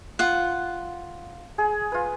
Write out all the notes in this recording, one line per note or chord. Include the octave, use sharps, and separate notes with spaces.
F4 F#5
G#4
F4 B4